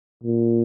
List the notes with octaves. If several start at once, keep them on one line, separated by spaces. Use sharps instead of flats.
A#2